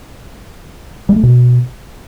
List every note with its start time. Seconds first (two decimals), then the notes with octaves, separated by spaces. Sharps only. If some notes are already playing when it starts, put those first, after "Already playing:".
1.09 G3
1.16 A3
1.23 B2